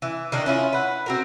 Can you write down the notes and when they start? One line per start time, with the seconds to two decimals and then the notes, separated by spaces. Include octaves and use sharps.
0.02 E3
0.32 D#3 A#3 D4
0.46 C#4 E4 F4
0.73 B4 F#5
1.06 C4 F#4 A#4